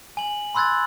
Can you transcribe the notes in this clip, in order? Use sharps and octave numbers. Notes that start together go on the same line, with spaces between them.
G#5 F#7
B5 C6 E6 F#6 G#6 A6